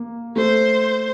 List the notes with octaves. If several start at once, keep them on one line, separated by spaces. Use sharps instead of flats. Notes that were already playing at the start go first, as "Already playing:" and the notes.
Already playing: A#3
A3 C5